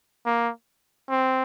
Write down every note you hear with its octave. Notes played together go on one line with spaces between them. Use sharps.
A#3
C4